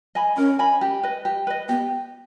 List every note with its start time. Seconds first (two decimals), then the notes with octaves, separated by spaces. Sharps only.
0.15 D#5 G#5 B5
0.37 C#4 A#4
0.59 D#5 G#5 B5
0.81 G4
1.03 B4 D#5
1.25 G4
1.47 B4 D#5
1.69 B3 G4